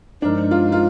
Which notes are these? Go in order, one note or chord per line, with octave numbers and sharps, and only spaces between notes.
G2 F3 G#3 D4 D#4 A#4
F4
F4